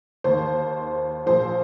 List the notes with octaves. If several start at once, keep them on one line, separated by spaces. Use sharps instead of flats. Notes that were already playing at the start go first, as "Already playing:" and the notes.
D#2 D#3 C5
A#1 A#2 F3 C5